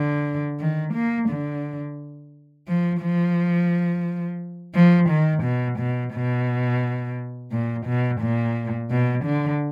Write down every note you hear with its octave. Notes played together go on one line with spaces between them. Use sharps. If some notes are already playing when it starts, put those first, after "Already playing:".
Already playing: D3
D#3
A#3
D3
F3
F3
F3
D#3
B2
B2
B2
A#2
B2
A#2
B2
D3